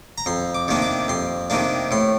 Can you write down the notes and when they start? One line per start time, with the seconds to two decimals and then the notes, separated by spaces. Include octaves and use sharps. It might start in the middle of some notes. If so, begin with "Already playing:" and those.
0.18 A#5
0.26 F2 C6
0.54 D6
0.68 C3 D#3 A#3 D4
0.82 D6
1.08 F2 C6
1.50 C3 D#3 A#3 D4
1.91 A2 C6